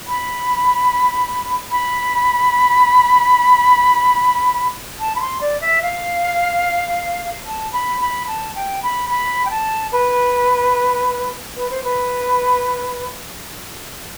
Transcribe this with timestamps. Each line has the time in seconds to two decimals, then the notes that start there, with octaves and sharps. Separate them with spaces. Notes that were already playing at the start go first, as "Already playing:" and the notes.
0.07 B5
1.71 B5
5.00 A5
5.16 B5
5.20 C6
5.41 D5
5.61 E5
5.82 F5
7.46 A5
7.73 B5
8.01 B5
8.27 A5
8.55 G5
8.83 B5
9.10 B5
9.45 G5
9.50 A5
9.92 B4
11.56 B4
11.70 C5
11.84 B4